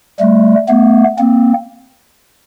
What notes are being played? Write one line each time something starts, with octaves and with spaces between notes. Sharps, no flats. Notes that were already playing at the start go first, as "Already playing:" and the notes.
G3 A3
A3 B3
A#3 C4